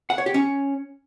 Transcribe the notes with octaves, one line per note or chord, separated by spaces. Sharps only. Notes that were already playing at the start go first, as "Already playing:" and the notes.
F#5
C#5
G4
C#4